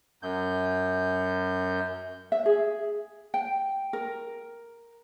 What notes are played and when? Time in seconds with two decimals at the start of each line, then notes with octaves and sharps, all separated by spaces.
0.23 F#2 G6
2.32 E5
2.46 G#4
3.34 G5
3.93 A#4